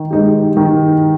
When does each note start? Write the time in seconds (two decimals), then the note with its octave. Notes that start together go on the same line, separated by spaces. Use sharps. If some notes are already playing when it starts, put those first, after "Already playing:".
Already playing: D#3
0.11 G#3 D#4 G4
0.57 D#3